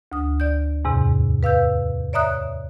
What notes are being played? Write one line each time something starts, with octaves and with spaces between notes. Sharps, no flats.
D2 D#6
D5 G6
E2 G#2 C3
B4 F5 E6 G6
C#5 D5 E5 A#5 D#6 F#6